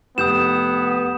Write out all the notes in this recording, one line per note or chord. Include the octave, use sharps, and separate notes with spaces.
F1 B3 D#6 G6 E7